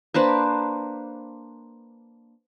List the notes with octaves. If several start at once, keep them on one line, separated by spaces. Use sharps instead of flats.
A#3 D4 B4 C5